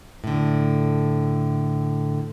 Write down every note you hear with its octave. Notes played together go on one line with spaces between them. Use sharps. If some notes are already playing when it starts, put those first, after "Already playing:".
A2 D3